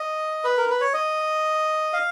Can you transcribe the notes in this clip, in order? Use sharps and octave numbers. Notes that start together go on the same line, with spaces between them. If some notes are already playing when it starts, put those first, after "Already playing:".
Already playing: D#5
B4
A#4
B4
C#5
D#5
F5